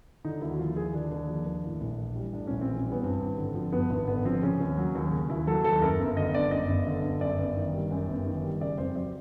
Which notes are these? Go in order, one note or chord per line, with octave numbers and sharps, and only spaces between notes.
D3 D#4
D#2 E4
F#4
F3 F4
D#2 G#4
D3 D4
D#2
F3
D#2
A2
A#1
E3
G3
A2 D4
A#1 C#4
C4
E3
C#4
G3
B3
G2 C4
G#1
D3
F3
G2 B3
G#1
D3 B3
F3 C4
C#3 C#4
D#2
F#3
D#2
C#3
D#2 E4
F#3 A4
D#2 A4
F#2 A#4
G1
D3 D#5
G1 D5
F#2 D#5
G1
D3
G1
F#2 D5
G1
D#3
G3
F#2
G1
D#3
G3
C#3 D5
F2 C5
F#3 D5